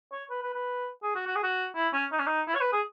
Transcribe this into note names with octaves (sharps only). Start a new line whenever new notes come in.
C#5
B4
B4
B4
G#4
F#4
F#4
G#4
F#4
E4
C#4
D#4
C#4
D#4
E4
C#5
B4
G#4